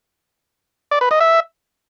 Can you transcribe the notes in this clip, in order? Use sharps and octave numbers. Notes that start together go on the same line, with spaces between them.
D5
B4
D#5
E5